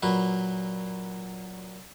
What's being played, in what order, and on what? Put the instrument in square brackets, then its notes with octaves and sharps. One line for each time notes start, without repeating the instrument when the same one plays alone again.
[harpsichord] A#2 F#3 B4